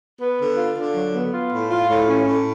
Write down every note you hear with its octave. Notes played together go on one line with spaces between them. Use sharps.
B3
D3
F4
D3
F#3
B3
F4
A2
F4
A2
C#4
A2